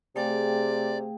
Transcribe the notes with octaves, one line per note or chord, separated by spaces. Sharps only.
C3 A3 G#4 D5 F5 G5